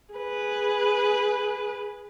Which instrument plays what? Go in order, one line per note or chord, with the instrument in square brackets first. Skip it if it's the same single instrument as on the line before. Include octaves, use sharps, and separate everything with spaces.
[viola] G#4 B4